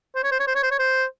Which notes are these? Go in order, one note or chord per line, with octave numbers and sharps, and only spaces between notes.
C5
C#5
C5
C#5
C5
C#5
C5
C#5
C5